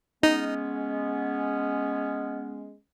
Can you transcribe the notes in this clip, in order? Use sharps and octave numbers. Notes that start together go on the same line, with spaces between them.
G#3 B3 C#4 D#4